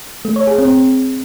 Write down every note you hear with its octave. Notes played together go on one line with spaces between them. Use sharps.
A3
C#5
G#4
C4